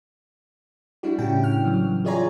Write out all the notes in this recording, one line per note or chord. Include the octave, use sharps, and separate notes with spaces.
G3 D4 E4 F#4
A2 C#3 G3 C#4 G5
F6
E3 F#3
F4 G#4 C#5 D5 G#5 A#5